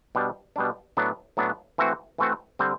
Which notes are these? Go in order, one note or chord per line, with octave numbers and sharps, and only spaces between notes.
B2 G3 D4
B2 G3 D4
A2 F#3 B3 D4
A2 F#3 B3 D4
E3 A3 C4 F#4
E3 A3 C4 F#4
D3 G3 C4